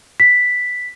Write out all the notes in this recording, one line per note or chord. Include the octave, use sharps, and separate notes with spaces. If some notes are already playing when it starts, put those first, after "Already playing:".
B6